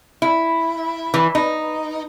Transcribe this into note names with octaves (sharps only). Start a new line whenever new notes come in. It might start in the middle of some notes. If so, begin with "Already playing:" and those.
E4
E3
D#4